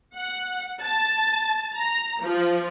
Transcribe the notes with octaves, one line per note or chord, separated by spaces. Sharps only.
F#5
A5
A#5
F3